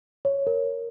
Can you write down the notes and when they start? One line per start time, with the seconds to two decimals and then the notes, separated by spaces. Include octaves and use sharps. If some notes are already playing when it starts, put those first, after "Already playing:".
0.25 C#5
0.47 A#4